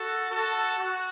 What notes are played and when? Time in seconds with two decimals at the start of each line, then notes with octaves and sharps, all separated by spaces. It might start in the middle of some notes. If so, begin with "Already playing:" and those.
Already playing: F#4 A4
0.30 F#4 A4
0.79 F#4